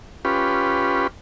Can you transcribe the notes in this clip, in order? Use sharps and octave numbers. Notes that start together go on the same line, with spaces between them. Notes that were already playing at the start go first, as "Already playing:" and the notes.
C#4 F4 G4 B4